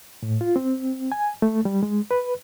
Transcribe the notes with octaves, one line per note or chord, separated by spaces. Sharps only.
A2
F4
C4
G#5
A3
G3
G#3
B4